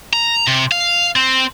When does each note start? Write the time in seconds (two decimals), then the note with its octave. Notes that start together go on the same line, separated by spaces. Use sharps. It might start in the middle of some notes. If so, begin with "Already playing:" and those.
0.13 A#5
0.47 C3
0.71 F5
1.16 C4